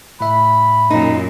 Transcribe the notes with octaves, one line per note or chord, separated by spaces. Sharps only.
A2 E5 B5
F#2 A#2 D#4